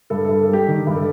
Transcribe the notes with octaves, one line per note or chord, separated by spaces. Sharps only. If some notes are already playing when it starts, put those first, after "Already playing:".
G2 A4
G2 A4
A4
G3 G4
D#3
G2
A4